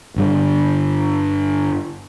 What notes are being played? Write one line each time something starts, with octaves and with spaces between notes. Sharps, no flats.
G1 G2 D3